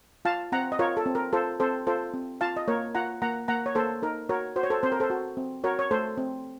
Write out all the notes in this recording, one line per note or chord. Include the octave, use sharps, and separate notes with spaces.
F4 F5 A5
C4 F#5 A#5
D#5
F4 A#4 C#5
A4
C4
A#4
F4 A4 C5
C4 A4 C5
F4 A4 C5
C4
F4 F5 A5
D#5
A#3 A#4 C#5
F4 F#5 A#5
A#3 F#5 A#5
A#3 F#5 A#5
C#5
A#3 A4 C5
D#4 A#4
F#4 A#4 C#5
F#4 C5
C#5
A4 C5
C4 C5
A#4
A4 C5
F#4
C4
F#4 A#4 C#5
C#5
A3 A4 C5
C4